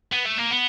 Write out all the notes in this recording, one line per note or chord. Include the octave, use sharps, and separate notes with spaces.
B3
A3
A#3
B3